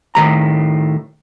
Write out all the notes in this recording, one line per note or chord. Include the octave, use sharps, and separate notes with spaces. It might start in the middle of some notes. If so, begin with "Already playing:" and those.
A2 D#3 F#3 A#5